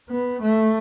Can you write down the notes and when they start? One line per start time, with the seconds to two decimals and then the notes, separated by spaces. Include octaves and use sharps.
0.09 B3
0.41 A3